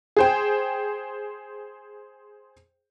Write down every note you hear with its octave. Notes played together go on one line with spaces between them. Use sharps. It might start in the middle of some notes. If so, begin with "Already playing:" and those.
G#4 C5 G5